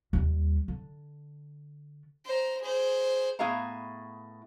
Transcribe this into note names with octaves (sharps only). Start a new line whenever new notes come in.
D#2 G3
D3
C5 A#5
G#4 C5
A2 B3 G#4 E5 F5 A#5